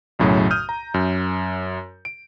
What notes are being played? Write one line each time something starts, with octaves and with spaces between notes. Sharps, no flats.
B1 F#2 A2 C#3 F#3
D#6 F6 G6 D#7
A#5
F#2
D7